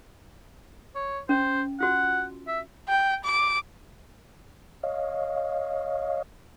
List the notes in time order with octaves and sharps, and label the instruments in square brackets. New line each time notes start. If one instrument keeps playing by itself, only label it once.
[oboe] C#5
[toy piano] C#4 [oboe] C5
[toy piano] F4 F#4 [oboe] F#5
[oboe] E5
[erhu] G5
D6
[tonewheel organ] C#5 D#5 F5